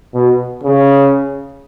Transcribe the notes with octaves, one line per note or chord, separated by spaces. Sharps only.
B2
C#3